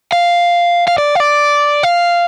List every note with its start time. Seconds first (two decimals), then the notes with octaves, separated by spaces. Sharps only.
0.12 F5
0.88 F5
0.98 D5
1.15 F5
1.20 D5
1.83 F5